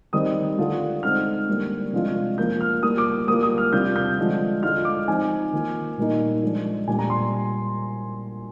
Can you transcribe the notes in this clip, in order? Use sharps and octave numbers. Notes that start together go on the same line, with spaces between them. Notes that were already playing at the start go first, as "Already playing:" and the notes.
D#3 G3 C4 D#4 D#6
D3 G3 D4 F4
D3 G#3 C4 D#4 F6
D3 G3 A#3 D4
C3 F3 G#3 D4 F4
F3 A#3 D4 F4 G6
F6
G3 A#3 F4 D#6
D6
G3 A#3 F4 D#6
D#6
F6
C3 G3 D4 F4 G6
G6
D3 F3 G#3 D4 F4
D3 G#3 D4 F4 F6
D6
F3 C4 D#4 G#5
D#3 A#3 F4
A#2 G3 A#3 D#4
F3 G#3 D4
A#2 G3 D4 G#5
A#5
C6